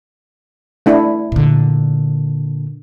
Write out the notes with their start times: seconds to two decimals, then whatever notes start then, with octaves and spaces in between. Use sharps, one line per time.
0.86 A3 D4 E4
1.32 A#2 D3